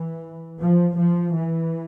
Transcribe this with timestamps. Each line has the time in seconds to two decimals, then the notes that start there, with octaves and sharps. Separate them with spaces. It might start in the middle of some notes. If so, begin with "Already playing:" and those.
Already playing: E3
0.61 F3
0.98 F3
1.35 E3